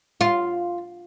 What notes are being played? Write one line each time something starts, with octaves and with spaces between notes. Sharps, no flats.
F4